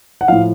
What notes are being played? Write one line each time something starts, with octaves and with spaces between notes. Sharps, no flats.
F#5
A2 F3 F5